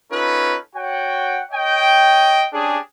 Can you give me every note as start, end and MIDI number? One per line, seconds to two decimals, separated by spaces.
0.11 0.57 61
0.11 0.57 63
0.11 0.57 65
0.11 0.57 69
0.11 0.57 71
0.75 1.40 66
0.75 1.40 73
0.75 1.40 78
0.75 1.40 79
1.52 2.46 73
1.52 2.46 75
1.52 2.46 79
2.53 2.78 61
2.53 2.78 62
2.53 2.78 67
2.53 2.78 68